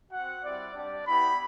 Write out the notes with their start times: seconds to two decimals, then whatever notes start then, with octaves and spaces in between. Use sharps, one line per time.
0.11 C4 F#4 F#5
0.42 G3 C4 E4 D5
0.74 G3 D4 G4 D5
1.07 B3 E4 G4 B5